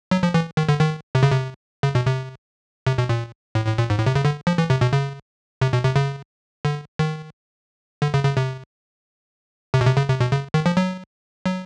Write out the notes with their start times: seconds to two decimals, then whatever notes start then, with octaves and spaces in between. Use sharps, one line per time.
0.11 F#3
0.23 F3
0.34 E3
0.57 D#3
0.69 D3
0.80 D#3
1.15 C3
1.23 C#3
1.30 C3
1.83 C#3
1.95 B2
2.06 C3
2.87 C3
2.98 B2
3.09 A#2
3.55 A2
3.67 A2
3.78 A#2
3.90 G#2
3.98 A2
4.06 C3
4.15 C#3
4.25 D3
4.47 F3
4.58 E3
4.70 C3
4.81 B2
4.93 C#3
5.62 C3
5.73 B2
5.84 C3
5.96 C#3
6.65 D3
6.99 D#3
8.02 D3
8.14 C#3
8.25 C#3
8.37 C3
9.74 C3
9.81 B2
9.85 C3
9.97 C#3
10.08 C3
10.20 B2
10.31 C#3
10.54 D#3
10.66 F3
10.77 F#3
11.46 F#3